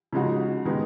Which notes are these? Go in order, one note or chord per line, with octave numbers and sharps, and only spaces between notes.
C#3 F3 G#3 D#4 F#4
D#3 G#3 B3 D#4